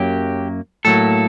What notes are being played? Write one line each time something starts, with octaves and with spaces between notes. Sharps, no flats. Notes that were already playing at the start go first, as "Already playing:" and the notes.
Already playing: F#2 F#3 A#3 G4
A2 F#3 A#3 A4